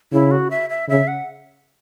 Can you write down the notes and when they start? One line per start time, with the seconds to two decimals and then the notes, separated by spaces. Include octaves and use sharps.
0.12 C#3 E4
0.31 F#4
0.51 E5
0.70 E5
0.88 C#3 E5
1.08 F#5